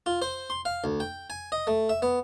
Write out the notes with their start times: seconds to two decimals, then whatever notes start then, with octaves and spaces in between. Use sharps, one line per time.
0.06 F4
0.22 C5
0.50 C6
0.65 F5
0.84 D2
1.00 G5
1.30 G#5
1.52 D#5
1.67 A3
1.89 E5
2.02 B3